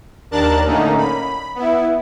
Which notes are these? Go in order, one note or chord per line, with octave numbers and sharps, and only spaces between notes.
D#2 D4 A#4 A5 F#6 A6
A2 D3 A#3 C#4 D#4
B5
B3 E4